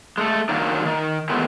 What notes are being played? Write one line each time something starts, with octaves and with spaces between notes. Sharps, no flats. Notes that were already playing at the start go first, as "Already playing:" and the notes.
G#3 A3 A4
D#3 F#3 A#3 D4 D#4
D#3
D#3 E3 F#3 G#3 A3 B3